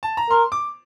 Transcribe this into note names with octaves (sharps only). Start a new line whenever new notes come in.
A5
A#5
A#4 C6
D6